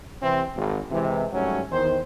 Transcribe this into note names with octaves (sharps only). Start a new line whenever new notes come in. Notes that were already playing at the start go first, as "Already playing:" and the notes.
C3 E3 C4
G#1
C3 E3 G#3
G#1 G#2 F#3 G3 A3 C#4
E2 D#3 C5